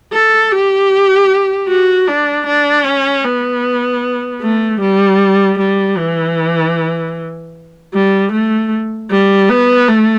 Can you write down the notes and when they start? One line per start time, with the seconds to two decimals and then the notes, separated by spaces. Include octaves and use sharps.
0.13 A4
0.51 G4
1.69 F#4
2.08 D4
2.47 D4
2.85 C#4
3.24 B3
4.42 A3
4.81 G3
5.59 G3
5.98 E3
7.93 G3
8.32 A3
9.10 G3
9.50 B3
9.88 A3